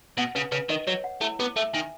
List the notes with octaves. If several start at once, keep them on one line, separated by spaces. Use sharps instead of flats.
B2 F#5
C#3 B4
C#3 B4
D#3 D#5
F#3 C#5
F#5
A3 E4
B3 G#4
A3 E5
D#3 G#5